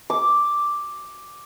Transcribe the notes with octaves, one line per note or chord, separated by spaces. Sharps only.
D6